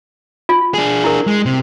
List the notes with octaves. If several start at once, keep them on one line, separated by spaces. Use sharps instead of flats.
F4
D4 G#4
E4 A#4
G#3
C3